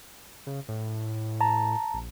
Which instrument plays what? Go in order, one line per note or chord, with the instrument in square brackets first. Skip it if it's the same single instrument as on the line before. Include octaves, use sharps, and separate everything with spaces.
[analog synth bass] C#3
A2
[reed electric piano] A5 A#5
[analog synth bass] A#1